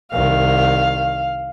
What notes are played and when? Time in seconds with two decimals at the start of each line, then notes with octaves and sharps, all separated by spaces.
0.12 C2 D#3 F5